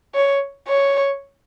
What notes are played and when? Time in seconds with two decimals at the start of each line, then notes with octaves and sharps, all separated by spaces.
0.15 C#5
0.68 C#5